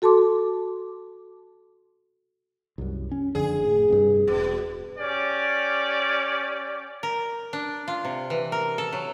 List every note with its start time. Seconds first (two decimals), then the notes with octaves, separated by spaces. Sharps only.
0.02 F#4 A4 A5 C6 D6
2.78 C2 F#2
3.11 C#4
3.35 F#1 F2 D3 G#4
3.64 A2
3.90 G2 C3
4.27 E1 B2
4.97 C#4 G4 D5
7.03 A#4
7.53 D4
7.88 F4
8.05 C3
8.30 E3
8.52 A#4
8.78 A4
8.93 F#3